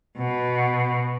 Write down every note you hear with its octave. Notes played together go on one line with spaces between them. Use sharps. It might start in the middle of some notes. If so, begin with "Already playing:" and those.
B2